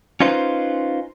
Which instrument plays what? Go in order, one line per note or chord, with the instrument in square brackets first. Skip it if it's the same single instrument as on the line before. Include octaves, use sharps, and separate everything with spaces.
[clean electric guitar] C#4 D#4 F4 B4 C5